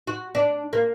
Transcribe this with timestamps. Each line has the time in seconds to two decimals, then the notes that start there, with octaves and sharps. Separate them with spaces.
0.07 F#4
0.35 D4
0.73 A#3